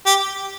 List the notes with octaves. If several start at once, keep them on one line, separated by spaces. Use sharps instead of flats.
G4